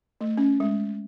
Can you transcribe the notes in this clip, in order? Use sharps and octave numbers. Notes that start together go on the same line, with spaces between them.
A3
C#4
G#3